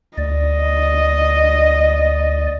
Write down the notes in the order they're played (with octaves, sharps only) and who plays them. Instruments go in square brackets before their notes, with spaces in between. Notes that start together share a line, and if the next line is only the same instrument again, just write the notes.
[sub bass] D2 [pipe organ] D5 [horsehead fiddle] D#5